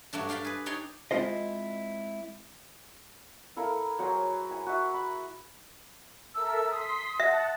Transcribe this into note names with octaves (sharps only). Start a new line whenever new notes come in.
G2 F#3 A3 D4
D4 F5 G5 A5 B5
G#4 B4
D4 D#4 C#5 G5 C6
G#3 C4 E4 F4 C5 D#5
E4 A4 A#4 F5
F#3 G#4 C5 A#5
E4 G#5
F#4 E5
B5
A4 A#4 E5 E6
C6 D#6 B6
E5 F#5 A5